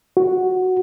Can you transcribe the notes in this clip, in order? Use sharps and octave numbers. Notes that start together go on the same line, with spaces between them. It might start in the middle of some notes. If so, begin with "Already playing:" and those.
F#4